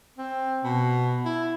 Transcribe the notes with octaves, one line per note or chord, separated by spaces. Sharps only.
C4
B2
E4